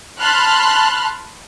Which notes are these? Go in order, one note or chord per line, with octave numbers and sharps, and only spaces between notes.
A5 B5 C6 F6 F#6